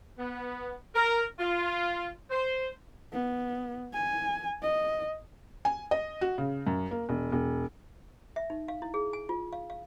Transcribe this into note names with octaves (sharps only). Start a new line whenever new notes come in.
B3
A#4
F4
C5
B3
G#5
D#5
G#5
D#5
F#4
C#3
F#2
A#3
E1
E1
E5
D#4
F5
E4
G#4
G#5
F4
F5
F5